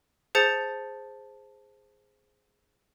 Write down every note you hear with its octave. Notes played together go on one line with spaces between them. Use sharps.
G#4 C5 A5 G6 A6 C#7